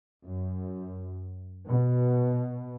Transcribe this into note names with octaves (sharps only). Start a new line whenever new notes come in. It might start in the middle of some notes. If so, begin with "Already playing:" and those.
F#2
B2